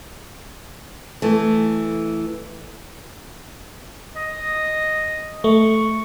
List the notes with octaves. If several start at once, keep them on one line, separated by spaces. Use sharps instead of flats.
E3 A3
D#5
A3 C#6